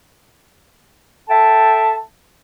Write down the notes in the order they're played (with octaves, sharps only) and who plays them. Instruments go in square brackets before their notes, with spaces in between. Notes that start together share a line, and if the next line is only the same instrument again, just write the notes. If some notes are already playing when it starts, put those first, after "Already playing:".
[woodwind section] A4 E5 G5 A5